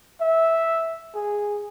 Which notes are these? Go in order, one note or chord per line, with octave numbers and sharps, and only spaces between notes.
E5
G#4